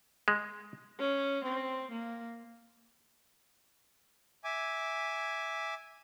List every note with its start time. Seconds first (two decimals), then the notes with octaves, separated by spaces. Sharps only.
0.28 G#3
0.99 C#4
1.44 C4
1.91 A#3
4.44 E5 G#5 D6